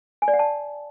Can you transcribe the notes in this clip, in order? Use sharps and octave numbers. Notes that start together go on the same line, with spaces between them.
G#5
D5
F#5
A5